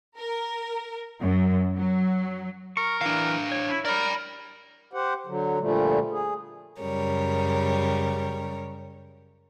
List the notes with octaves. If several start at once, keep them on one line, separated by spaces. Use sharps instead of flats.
A#4
F#2
F#3
A#4 C#6
E3 D4 F5
C#5
E4
A#4 D5 B5
G4 C5 F#5
D3 F#3
A#2 D3 F3 G3 A3
G#4
F#2 C#3 G3 A#4 C#5